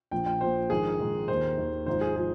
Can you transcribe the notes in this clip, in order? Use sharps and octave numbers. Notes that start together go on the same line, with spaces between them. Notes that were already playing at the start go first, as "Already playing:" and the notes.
A#1 A#2 F3 G5
G5
A#1 A#2 F3 C5
A#1 G#2 D#3 G#4
A#1 G#2 D#3
D#2 D#3 C5
D#2 D#3
G#1 G#2 F3 C5
G#4
F3 G#4